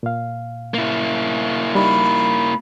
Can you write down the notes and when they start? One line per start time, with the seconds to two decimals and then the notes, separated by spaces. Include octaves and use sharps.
0.03 A#2 F5
0.74 A#3 E4
1.75 G3 D#4 B5